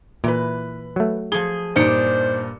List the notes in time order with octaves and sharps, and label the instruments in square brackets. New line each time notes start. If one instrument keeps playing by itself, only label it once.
[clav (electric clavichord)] A#2 [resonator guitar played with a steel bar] E3 B4
[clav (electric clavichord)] F#3 A3
[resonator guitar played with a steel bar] F3 G#4 [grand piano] G7
[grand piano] G2 A#2 C#7 [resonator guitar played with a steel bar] D4 D#4 [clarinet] C5